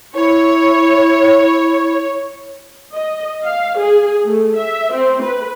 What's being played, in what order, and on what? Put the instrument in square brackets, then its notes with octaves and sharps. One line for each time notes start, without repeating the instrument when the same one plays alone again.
[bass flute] E4 [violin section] C#5
[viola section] D#5
F5
G#4
A3
E5
C4
B4